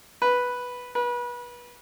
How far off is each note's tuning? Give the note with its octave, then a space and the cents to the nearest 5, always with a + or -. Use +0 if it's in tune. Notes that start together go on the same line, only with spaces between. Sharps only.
B4 -5
B4 -30